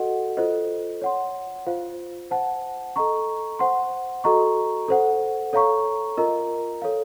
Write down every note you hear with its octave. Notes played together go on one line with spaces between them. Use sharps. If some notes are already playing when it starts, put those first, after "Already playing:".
Already playing: F#4 A4 D#5 F#5
F4 A4 C5 D#5
C#5 F#5 C6
F4 C5 F5
C5 F#5 A5
A4 D#5 A#5 C#6
C5 F#5 C6
F#4 A4 D#5 A#5 C#6
A4 C5 F#5
A4 C#5 F5 A#5 C#6
F4 A#4 D#5 A#5
A4 C#5 F5